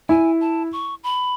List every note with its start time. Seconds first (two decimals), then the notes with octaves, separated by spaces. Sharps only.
0.09 E4 G#5
0.41 A5
0.73 C#6
1.04 B5